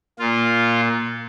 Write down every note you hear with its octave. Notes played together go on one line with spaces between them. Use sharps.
A#2 F4